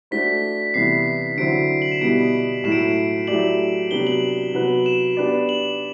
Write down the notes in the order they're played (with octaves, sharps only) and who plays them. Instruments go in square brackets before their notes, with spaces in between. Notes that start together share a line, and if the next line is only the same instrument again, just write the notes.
[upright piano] A3 D4 F#4 C5 [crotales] B6
[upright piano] C3 E3 G3 B3 E4 [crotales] C7
[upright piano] D3 F#3 C4 E4 [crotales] D7
[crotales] F#7
E7
[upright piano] B2 G3 B3 E4 [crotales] D7
[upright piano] A2 F#3 A3 E4 [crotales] E7
[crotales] D7
E7
[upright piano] F#3 A3 E4 G4 D5 [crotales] F#7
[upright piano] C3 F#3 B3 D4 G4 [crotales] G7
[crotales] F#7
[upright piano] C3 F#3 B3 F#4 B4
[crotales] E7
[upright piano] B3 D4 G4 B4 D5
[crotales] F#7